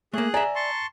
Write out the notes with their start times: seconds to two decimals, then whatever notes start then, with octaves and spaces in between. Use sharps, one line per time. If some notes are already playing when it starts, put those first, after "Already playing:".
0.13 A3 A#3 G#4 F#6
0.34 D5 E5 G#5 A#5
0.55 A5 C6 C#6